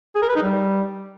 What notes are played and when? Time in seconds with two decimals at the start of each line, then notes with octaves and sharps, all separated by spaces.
0.16 G#4
0.22 A#4
0.29 B4
0.36 D#4
0.43 G3